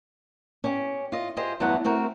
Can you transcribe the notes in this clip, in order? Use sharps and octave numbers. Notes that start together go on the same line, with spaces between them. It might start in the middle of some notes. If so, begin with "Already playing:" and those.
C#4 G4
F4 D#5
F4 G4 G#4 C5 D#5
E2 G2 F#3 A3 B3 F#5
A3 C4 F#4 A#4